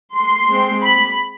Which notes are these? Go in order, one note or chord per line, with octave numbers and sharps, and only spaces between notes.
C6
G#3 C4
B5